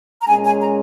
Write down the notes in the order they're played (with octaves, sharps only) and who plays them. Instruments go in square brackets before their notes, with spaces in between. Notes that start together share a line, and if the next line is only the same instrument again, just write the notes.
[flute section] A#5
[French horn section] A#2 G#3 C#4 [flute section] G#5
[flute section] G#5
A#5